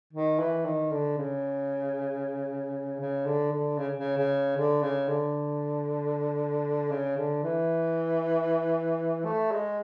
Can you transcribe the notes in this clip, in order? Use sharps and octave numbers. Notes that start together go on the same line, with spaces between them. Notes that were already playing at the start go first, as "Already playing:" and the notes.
D#3
E3
D#3
D3
C#3
C#3
D3
D3
C#3
C#3
C#3
D3
C#3
D3
C#3
D3
E3
A3
G#3